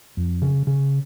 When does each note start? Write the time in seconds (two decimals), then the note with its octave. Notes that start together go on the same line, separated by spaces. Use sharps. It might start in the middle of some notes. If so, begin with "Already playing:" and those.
0.17 F2
0.42 C#3
0.67 C#3